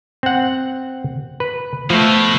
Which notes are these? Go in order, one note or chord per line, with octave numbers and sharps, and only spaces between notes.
C4 F#5
B4
B2 F3 A3